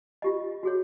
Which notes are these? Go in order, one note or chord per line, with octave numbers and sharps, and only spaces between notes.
F4 G4 D#5
F#4 G#4 C#5